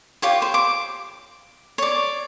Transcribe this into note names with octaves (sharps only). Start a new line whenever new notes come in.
F4 G4 C#5
C5
D6
C#5 D5